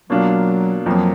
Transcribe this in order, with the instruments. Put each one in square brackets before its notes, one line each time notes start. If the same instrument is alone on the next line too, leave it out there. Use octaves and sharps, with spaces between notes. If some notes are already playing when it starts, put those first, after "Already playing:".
[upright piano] B2 A#3 D4 F4 [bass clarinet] F#3
[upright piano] F2 F3 A#3 [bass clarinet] F#3